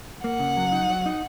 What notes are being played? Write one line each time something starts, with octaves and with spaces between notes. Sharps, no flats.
A#3 F#5
C#3
F#3
D#4
F#3
D#4